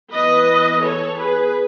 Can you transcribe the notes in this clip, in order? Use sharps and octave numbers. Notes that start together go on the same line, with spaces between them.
E3 B3 B4 D#5
A4 C#5
G#4 B4